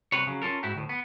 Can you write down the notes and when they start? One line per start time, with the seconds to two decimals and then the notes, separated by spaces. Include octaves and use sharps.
0.12 C2 C3 B4 C#5
0.27 C#3 F#3
0.42 C#4 F4 A4 A#4
0.63 G#2 E4 F#4 G4
0.75 D2 A2
0.89 B3